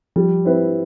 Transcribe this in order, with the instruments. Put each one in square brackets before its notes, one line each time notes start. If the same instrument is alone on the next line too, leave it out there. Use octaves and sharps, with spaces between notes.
[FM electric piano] F3 [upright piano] G3
[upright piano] C4 E4 B4